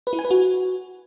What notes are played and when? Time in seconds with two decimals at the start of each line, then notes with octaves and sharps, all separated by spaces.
0.07 B4
0.13 E4
0.19 G#5
0.25 B4
0.31 F#4